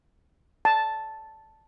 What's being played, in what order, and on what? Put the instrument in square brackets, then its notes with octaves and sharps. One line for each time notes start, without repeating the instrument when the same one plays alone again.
[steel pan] A5